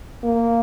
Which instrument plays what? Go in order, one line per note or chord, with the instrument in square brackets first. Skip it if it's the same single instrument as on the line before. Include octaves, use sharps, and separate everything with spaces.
[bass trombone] A#3